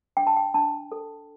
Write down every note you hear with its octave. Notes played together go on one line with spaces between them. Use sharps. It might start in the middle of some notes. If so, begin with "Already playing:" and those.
D4 G5
A5
G5
D4 A5
A4